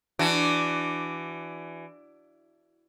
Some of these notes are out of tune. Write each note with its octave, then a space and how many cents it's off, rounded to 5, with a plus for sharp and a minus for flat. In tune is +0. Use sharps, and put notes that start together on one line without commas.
E3 +20 D4 +0 F#4 +20